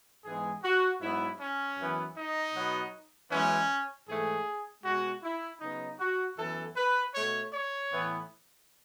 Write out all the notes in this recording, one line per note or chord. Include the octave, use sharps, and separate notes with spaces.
G#2 E3 G#3 B3 G#4
F#4
G#2 F#3 B3 E4
C#4
F#2 E3 B3
D#4
B2 F#3 B3
F#2 E3 G#3 B3 C#4
G#2 E3 A3 G#4
B2 G#3 B3 F#4
E4
C#3 F#3 B3 D#4
F#4
F#2 E3 B3 A4
B4
B2 A3 C#5
C#5
A2 E3 B3